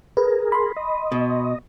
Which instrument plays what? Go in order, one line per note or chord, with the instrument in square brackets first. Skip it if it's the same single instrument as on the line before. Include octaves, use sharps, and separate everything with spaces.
[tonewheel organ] G#4 A#4 [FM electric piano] B4
[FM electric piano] B5 C6
[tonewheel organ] D#5
[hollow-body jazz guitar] B2